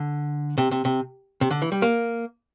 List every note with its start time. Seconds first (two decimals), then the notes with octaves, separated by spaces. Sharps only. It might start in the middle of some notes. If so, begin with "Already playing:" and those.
Already playing: D3
0.58 C3
0.71 C3
0.85 C3
1.41 C3
1.51 D3
1.62 E3
1.72 G3
1.82 A#3